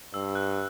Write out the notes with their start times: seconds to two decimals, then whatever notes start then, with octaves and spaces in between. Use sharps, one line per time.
0.14 G2 E6
0.35 F#6